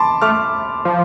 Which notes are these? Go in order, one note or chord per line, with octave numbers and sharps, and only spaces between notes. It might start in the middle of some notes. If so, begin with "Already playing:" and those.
Already playing: A5 B5 C6 D6
A3 D6 F6
F3